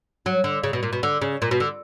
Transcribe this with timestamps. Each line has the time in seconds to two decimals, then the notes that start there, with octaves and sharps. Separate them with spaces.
0.26 F#3
0.44 D3
0.64 C#3
0.73 B2
0.83 A#2
0.93 B2
1.03 D3
1.22 C#3
1.42 A#2
1.51 B2
1.60 D3